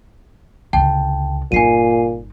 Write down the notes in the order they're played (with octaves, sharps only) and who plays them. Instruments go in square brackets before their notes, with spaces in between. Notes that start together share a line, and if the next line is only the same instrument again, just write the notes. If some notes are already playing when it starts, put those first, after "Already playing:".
[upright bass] C#2 D3 [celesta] G5 A5
[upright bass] G1 D#4 [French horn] A#2 [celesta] G#5 C7 D#7